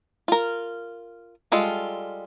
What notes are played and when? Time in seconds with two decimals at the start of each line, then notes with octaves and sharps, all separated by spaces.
0.28 F4 A#4
1.52 G3 G#3 F4 A4